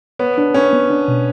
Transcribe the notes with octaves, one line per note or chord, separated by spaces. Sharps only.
B3 C#5
D4
C#4 C#5
B3
D4
B2